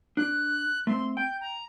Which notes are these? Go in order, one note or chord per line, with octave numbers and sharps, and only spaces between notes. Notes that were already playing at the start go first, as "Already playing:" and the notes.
D4 F#6
A3 C4 C6
G5 G6
A#5